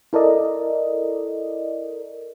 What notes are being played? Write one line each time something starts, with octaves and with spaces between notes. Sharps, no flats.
E4 A4 A#4 D5 D#5